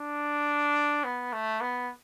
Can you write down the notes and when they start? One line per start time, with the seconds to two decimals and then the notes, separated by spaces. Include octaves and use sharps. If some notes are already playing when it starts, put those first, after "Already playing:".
Already playing: D4
1.04 B3
1.33 A3
1.61 B3